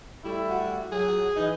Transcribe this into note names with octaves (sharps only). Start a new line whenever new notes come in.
G3 A3 E4
F#4
F#3 G#4
E3 D#4